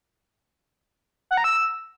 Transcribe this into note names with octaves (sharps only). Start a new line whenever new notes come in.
F#5
A#5
E6